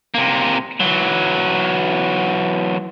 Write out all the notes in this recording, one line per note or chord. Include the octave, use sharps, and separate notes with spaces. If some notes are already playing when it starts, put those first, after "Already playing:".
C3 A#3
E3 F#3